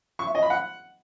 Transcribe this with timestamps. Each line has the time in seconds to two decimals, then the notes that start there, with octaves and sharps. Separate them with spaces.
0.19 C#6
0.27 E5
0.35 D#5
0.42 B5
0.50 F#5